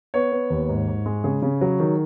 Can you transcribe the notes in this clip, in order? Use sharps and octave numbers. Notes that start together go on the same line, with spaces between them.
B3 C#5
B3
D#2
G#2
G#2
G#3
C#3 G#4
C#3
F#3
D#3